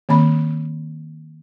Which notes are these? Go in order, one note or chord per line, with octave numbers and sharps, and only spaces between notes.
D#3 A#3 C4 B5